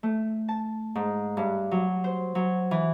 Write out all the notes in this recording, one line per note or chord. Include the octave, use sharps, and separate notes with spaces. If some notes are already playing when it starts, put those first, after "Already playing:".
A3
A5
G#2
G2
F#3
C5
F#3
E3